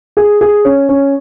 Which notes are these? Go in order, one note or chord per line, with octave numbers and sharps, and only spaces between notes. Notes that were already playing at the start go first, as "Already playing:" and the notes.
G#4
G#4
C#4
C#4